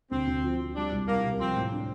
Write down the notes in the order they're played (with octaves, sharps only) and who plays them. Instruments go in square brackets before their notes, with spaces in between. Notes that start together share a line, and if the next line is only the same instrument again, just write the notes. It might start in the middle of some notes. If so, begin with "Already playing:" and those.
[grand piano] D2 [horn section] C4
[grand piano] D2
F3
F3
[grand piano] G3 [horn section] D4
[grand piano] C2
[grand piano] C2 [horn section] A#3
[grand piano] C3
[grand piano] F3 [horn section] C4
[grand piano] A2
D4